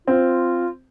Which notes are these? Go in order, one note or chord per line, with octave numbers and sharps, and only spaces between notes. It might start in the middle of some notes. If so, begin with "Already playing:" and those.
C4 F4